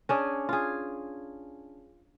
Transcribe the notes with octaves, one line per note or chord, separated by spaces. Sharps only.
C#4 D4 G#4
F4 G#4